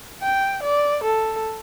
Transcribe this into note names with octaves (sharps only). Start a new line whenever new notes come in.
G5
D5
A4